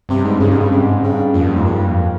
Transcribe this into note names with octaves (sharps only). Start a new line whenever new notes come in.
G2 C3
G#2
G2 C#3
G#2 C3
G2 C#3
C3
G#2
G2 C#3
F2 A#2
G2
F2 G#2
G2 A#2
F2